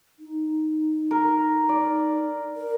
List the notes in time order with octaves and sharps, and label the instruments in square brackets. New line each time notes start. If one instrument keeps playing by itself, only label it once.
[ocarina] D#4
[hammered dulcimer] A#4
D5
[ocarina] A#4